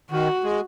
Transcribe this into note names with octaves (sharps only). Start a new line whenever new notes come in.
D#3 F#4
G#3